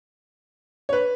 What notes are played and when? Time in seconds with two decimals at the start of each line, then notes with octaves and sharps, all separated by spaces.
0.89 C#5
0.93 B4